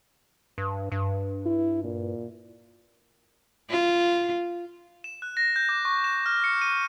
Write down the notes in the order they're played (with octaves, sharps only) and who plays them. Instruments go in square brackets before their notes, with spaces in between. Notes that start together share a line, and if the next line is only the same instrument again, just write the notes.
[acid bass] G2
G2
[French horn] E4
A#2
[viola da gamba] F4
[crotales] E7
F#6
A#6
G6
D6
C#6
E7
F6
C#7
D#7